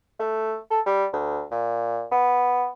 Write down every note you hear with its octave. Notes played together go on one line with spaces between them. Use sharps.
A3
A4
G3
D2
A#2
B3